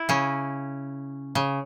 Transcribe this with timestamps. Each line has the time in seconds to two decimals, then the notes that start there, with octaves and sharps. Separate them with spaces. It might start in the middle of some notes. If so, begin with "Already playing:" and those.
Already playing: E4
0.09 C#3 C#4
1.35 C#3